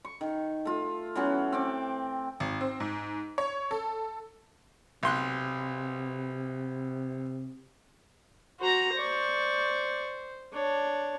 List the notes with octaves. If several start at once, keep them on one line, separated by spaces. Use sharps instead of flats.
C#6
D#3
A3 F4
E3 F#3 B3 C#4
C4 G5 D6
G#1
C4
G#2
C#5
A4
B1 C3 C6 F#6
F#4 C5 A#5
C5 D5 C#6
D4 C#5